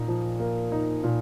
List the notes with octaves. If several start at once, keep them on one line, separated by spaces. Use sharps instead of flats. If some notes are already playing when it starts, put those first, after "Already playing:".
Already playing: A#2 A#3 D#4
F3
A#3
D#4
A#2